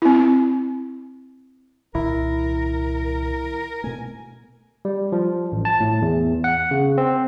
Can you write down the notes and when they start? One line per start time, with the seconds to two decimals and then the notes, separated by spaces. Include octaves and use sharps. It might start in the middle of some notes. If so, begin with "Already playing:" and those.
0.02 C4 E4
1.95 C2 A#2 D#3 E4 A#4
3.84 B2 A3 G#5
4.85 G3
5.12 F3
5.52 A1
5.65 A5
5.80 A2
6.02 E2
6.44 F#5
6.71 C#3
6.98 C4